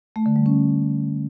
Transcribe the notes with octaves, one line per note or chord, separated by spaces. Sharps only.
A3
D3
G3
C#4